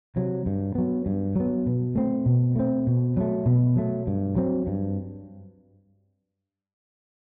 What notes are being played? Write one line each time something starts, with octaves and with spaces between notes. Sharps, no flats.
C3 F#3
G2
F#3 B3
G2
F#3 B3
B2
A3 C4
B2
A3 C4
B2
F#3 A3
B2
F#3 A3
G2
F#3 C4
G2